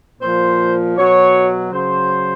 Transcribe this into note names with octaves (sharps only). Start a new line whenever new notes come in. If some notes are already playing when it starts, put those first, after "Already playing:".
A#2 F3 C5
B2 F#3 C#5
C#3 F#3 C5